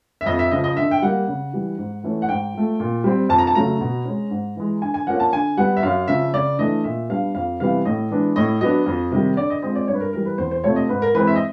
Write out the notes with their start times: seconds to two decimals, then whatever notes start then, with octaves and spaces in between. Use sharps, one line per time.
0.21 E5
0.26 F2 D#5
0.39 E5
0.51 C#3 F3 D#5
0.64 D#5
0.77 D3 E5
0.91 G5
1.02 G3 A#3 F#5
1.28 C#3
1.53 E3 G3
1.78 G#2
2.04 E3 A3 C#4
2.22 F#5
2.29 G#2 G5
2.54 F3 A3
2.80 A#2
3.04 G3 C4
3.29 F2 A5
3.38 A#5
3.47 A5
3.55 C#3 F#3 A3 A#5
3.81 B2
4.05 G#3 C#4
4.31 G#2
4.56 E3 G#3
4.82 D3 G#5
4.94 G#5
5.07 F3 A#3 C#4 F#5
5.20 A5
5.32 D3 G#5
5.57 G3 B3 F#5
5.77 E5
5.83 F#2 F5
6.08 C#3 F3 E5
6.33 C#3 D5
6.59 E3 A3 D4 D#5
6.84 A#2 E5
7.09 G3 B3 D4 F5
7.35 F2 F5
7.60 C3 E3 G3 B3 F5
7.85 A2 D#5
8.11 E3 G#3 B3 D4
8.36 A2 D#5
8.61 F#3 B3 D4 D#5
8.86 F2
9.12 C3 D#3 G3
9.37 D3 D5
9.50 D#5
9.62 F3 G#3 C4 D#5
9.75 D5
9.88 G2 C#5
9.94 B4
10.00 A#4
10.13 E3 G3 A#4
10.26 B4
10.38 E2 C5
10.51 C5
10.64 C3 F3 A3 C4 C#5
10.76 D#5
10.89 G#2 B4
11.02 A#4
11.14 E3 G#3 C4 B4
11.27 E5
11.36 D#5